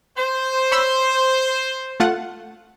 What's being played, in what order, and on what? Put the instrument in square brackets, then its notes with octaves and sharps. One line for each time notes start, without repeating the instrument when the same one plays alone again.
[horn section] C5
[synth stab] C#5 B5 E6
A3 F4 F#5